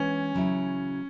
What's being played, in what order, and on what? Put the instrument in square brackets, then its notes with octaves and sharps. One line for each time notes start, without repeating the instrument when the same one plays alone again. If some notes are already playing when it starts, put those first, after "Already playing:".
Already playing: [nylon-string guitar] E3 G#3 B3 D4 [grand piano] C#4
[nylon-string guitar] C#3 F#3 A3 E4